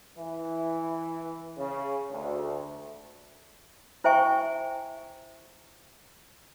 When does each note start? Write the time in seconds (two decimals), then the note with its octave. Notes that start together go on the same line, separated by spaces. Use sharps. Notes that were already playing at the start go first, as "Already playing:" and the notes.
0.17 E3
1.57 C#3
2.11 D2
4.04 E4 C5 E5 G5 G#5 C#6